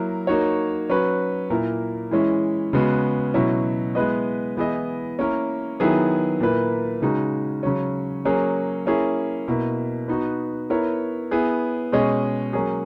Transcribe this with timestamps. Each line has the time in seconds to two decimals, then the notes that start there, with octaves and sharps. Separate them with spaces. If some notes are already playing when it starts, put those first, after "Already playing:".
Already playing: F#3 A#3 E4 A#4
0.27 A#3 D#4 F#4 C#5
0.89 F#3 C#4 F#4 B4
1.50 A#2 A#3 E4 A#4
2.11 E3 G#3 C#4 E4
2.73 C#3 G#3 B3 F#4
3.34 B2 F#3 C#4 E4
3.95 G#3 B3 E4 B4 D#5
4.57 E3 B3 E4 G#4 D#5
5.19 A#3 C#4 E4 A#4
5.80 D#3 F#3 B3 E4 G#4
6.40 A#2 A#3 E4 B4
7.02 C#3 G#3 D#4 F#4
7.63 C#3 F#3 C#4
8.25 F#3 A#3 C#4 G#4
8.86 A#3 C#4 E4 G#4
9.48 B2 A#3 E4
10.08 B3 D#4 F#4
10.70 B3 E4 A#4 C#5
11.31 B3 E4 G#4
11.92 B2 G#3 C#4 G#4 D#5
12.53 F#3 A#3 C#4 G#4